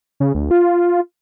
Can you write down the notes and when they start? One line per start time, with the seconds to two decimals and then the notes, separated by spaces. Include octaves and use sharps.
0.20 C#3
0.35 D2
0.51 F4